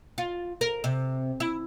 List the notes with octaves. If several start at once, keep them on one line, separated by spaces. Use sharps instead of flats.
F4
A#4
C3
E4